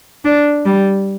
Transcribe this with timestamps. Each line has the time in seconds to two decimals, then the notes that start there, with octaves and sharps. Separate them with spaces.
0.25 D4
0.65 G3